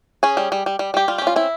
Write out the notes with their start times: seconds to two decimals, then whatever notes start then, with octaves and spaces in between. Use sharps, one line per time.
0.23 C#4 G#4
0.37 G3
0.52 G3
0.66 G3
0.79 G3
0.94 G3 G4
1.08 G3 F4
1.18 C#4 G4
1.27 F4
1.36 C4 E4